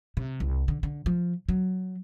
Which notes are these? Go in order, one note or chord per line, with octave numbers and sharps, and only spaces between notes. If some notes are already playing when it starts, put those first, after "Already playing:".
C3
C2
D3
D3
F3
F#3